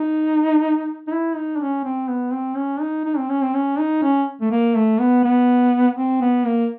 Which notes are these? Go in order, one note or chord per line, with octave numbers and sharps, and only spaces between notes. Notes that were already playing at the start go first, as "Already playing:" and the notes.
Already playing: D#4
D#4
E4
D#4
D4
C#4
C4
B3
C4
C#4
D#4
D#4
C4
C#4
C4
C#4
D#4
C#4
A3
A#3
A3
B3
B3
C4
B3
A#3